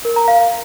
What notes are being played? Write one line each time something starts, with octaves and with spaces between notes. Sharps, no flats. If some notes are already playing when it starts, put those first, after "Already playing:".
A#4
A#5
F5